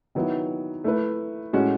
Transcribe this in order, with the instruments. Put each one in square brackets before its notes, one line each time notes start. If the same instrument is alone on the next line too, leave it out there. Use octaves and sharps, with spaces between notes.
[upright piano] D#3 F#3 B3 E4
A3 E4 B4
A2 G#3 C#4 F#4